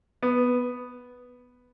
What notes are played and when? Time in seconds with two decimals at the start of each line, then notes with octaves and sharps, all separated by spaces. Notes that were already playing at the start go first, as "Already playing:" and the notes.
0.23 B3